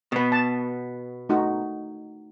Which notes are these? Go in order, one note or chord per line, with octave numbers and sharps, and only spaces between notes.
B2 B3
A5
A3 D#4 F#4